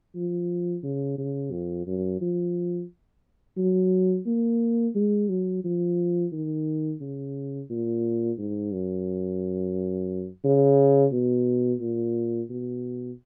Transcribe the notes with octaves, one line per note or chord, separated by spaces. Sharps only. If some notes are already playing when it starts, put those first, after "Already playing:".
F3
C#3
C#3
F2
F#2
F3
F#3
A#3
G#3
F#3
F3
D#3
C#3
A#2
G#2
F#2
C#3
B2
A#2
B2